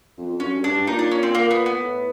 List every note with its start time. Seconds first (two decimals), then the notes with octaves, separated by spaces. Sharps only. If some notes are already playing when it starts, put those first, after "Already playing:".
0.17 F2
0.29 F2
0.40 F#2 C#4
0.57 G2
0.64 D4
0.72 G2
0.87 A#2 D#4
0.99 D4
1.11 C#4
1.23 C4
1.35 A#3
1.51 B3
1.66 B3
1.82 A2